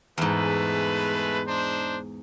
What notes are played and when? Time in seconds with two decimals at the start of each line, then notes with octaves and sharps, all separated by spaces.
0.18 E2 G#2 G#3 A3 B4
1.47 D4 D#4 C5